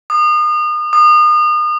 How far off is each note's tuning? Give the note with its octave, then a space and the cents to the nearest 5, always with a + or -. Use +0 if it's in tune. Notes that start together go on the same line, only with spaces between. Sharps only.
D#6 -35
D#6 -35